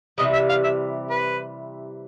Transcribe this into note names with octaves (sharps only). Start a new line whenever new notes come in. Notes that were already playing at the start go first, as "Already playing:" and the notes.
C3 E3 G3 D#5
E5
F5
E5
B4